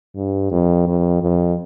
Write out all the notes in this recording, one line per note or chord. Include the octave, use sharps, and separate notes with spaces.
G2
F2
F2
F2